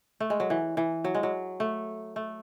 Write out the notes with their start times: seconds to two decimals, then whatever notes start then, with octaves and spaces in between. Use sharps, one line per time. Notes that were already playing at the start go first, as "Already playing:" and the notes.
0.20 A3
0.30 G#3
0.40 F#3
0.50 E3
0.77 E3
1.04 F#3
1.15 G#3
1.23 F#3
1.60 A3
2.16 A3